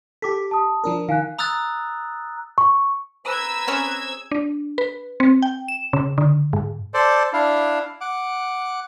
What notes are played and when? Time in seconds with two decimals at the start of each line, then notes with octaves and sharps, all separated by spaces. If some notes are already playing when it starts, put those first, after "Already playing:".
0.22 G4 A4 D6 B6
0.51 A5 D#6
0.84 F3 D4 A#4
1.09 D#3 F5 G#5 F#6
1.39 A#5 D#6 E6 F#6 A6
2.58 C#6
3.27 B4 C5 A#5 E6 G#6
3.67 C4 C#4 G#4
4.32 D4
4.78 B4
5.20 C4
5.42 G5
5.68 E7
5.93 C#3
6.18 D3
6.53 G#2
6.94 A4 C5 D5
7.33 D4 E4 F5
8.01 F#5 D6